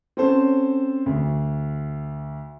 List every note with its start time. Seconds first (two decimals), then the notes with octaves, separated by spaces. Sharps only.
0.17 C4 C#4 A4 C5
1.06 D2